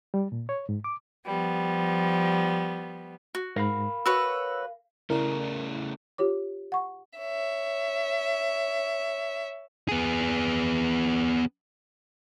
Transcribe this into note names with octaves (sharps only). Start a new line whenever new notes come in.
G3
A#2
C#5
G#2
D6
F3 G3 B3
F#4
G#2 A#4 F5 B5
F#4 B4 C#5 E6
C#3 A3 C#4 E4 G#4 A#4 D5
F4 G4 C#5 D6
F#5 C#6
C#5 E5
B3 G#4